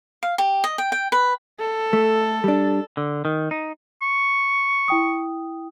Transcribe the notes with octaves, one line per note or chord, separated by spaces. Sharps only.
F5
G4
D#5
G5
G5
B4
A4
A3
G3 D4
D3
D#3
D#4
C#6
E4 G5 D#6